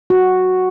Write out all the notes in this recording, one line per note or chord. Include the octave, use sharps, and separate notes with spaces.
F#4